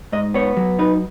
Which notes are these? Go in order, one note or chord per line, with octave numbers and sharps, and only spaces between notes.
G#2 D#5
B3 C#5
F#3
D#4 B4